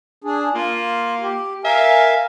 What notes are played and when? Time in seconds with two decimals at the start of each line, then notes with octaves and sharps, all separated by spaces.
0.24 D4 G#4
0.55 A#3 F4
1.22 G4
1.64 A#4 E5 F5 G#5